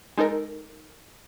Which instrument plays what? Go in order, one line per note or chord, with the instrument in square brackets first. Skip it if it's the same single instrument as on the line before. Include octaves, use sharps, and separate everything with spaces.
[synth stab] G#3 D#4 A4 A#4